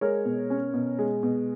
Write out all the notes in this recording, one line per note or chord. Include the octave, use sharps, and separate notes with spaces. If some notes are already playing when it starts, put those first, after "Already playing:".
G#3 A#4 C#5
B2
C#4
B2
G#3
B2